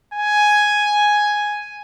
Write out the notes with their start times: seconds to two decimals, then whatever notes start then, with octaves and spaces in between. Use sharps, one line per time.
0.14 G#5